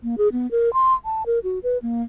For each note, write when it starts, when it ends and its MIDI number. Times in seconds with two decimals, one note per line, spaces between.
0.03 0.15 58
0.18 0.28 68
0.32 0.50 59
0.51 0.72 70
0.73 0.94 84
1.05 1.23 81
1.26 1.39 70
1.44 1.59 66
1.63 1.78 71
1.82 2.03 58